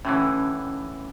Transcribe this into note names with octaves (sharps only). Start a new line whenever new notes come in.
A2 D3 E3 C#4 D#4 C#6